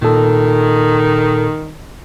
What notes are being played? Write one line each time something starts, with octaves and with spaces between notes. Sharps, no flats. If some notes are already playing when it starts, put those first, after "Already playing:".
A#2 D#3 A4